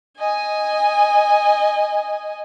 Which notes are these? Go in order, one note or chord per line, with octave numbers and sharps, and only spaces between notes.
D#5 G#5